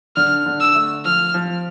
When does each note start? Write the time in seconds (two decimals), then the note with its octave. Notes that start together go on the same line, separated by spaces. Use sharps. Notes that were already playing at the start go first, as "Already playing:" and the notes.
0.16 D3 F6
0.46 D3
0.61 E6
0.75 A3
1.05 F3 F6
1.34 F3